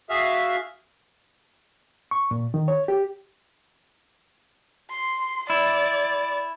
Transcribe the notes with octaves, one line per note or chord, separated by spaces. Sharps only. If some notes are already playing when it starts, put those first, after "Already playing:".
F#4 G#4 E5 F5
C#6
A#2
D#3
C#5
G4
C6
E4 D5